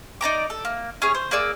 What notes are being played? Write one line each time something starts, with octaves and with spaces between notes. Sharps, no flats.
D#4 D5 A#5 D6
A4
A#3
C#4 G#4 C#5
C5
A#3 G#4 D5 E6